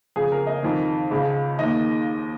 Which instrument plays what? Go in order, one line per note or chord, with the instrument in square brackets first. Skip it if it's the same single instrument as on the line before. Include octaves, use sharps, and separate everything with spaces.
[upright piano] F2 C#3 G#4
A#4
D#5
F2 D#3
C#2 C#3
D#2 D#3 D#5